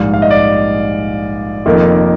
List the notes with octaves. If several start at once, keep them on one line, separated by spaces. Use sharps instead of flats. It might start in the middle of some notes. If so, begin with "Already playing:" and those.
Already playing: A#1 G#2 G3 F5
F5
D#5
D5
F1 F2 D#3 A#3